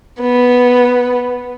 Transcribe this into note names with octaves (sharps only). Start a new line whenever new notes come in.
B3